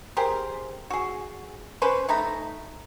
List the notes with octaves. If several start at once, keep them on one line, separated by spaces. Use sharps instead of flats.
G4 G#4 A#4 C5
F#4 G#4
C#4 B4 C5
A3 D#4 A#5 B5